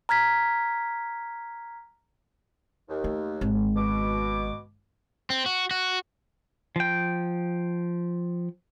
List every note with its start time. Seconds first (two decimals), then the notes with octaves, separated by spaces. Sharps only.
0.09 A#5 F6 G#6 B6
2.89 D#2
3.04 A3
3.41 G#1
3.76 B2 D6
5.30 C4
5.46 F#4
5.71 F#4
6.76 F3 G5